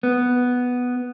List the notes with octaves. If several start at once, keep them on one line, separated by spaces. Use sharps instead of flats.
B3